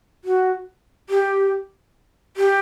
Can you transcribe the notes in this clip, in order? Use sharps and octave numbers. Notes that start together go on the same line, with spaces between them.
F#4
G4
G4